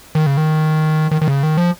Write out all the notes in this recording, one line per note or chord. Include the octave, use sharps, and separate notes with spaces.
D#3
C#3
D#3
D#3
D#3
C#3
D#3
F3